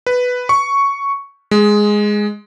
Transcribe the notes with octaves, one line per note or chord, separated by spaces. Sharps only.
B4
C#6
G#3